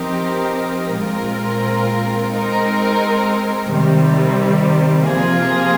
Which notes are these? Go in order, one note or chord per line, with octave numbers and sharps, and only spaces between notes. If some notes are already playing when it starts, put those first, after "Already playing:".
Already playing: F3 C4 D#4 G4 A#4
A#2 G#3 C4 F4 A#4
G#3 C4 D#4 A#4
C3 D#3 G3
C3 F3 A#3 F4 G#4